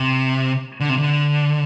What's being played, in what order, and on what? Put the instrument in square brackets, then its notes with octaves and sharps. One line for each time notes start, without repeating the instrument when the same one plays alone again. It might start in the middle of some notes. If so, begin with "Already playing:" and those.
Already playing: [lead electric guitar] C3
D3
C3
D3